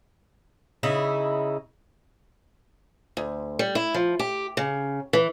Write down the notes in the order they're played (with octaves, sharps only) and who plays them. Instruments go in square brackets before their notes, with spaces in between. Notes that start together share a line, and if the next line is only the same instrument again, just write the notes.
[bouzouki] C#3 D#4 E4
[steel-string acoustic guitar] D2
G3
E4
F3
G4
C#3
E3